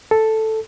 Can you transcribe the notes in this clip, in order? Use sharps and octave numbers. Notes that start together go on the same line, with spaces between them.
A4